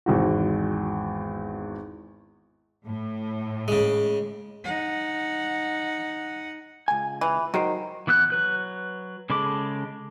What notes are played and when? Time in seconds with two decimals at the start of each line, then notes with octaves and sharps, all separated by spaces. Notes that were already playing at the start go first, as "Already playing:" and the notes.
0.06 G#1 E2 F#4
2.85 A2
3.68 C#3 G#3
4.64 D#4 F#5
6.88 C#2 G#5
7.21 E3
7.54 D#3 F#3 F#4 C5
8.07 E3 B3 E6 F#6
8.30 F#3 B4 F#6
9.30 C#3 G#3 A4 B5 D6